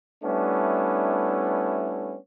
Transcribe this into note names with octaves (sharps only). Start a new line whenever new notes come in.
G3 A3 B3 C#4 D4 E4